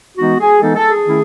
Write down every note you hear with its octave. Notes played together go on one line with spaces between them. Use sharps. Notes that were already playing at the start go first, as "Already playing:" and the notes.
E3 G#3 B3 D#4 F#4
G#4
E3 G#3 B3 D#4 A4
A4
G#4
D#3 A3 C#4 E4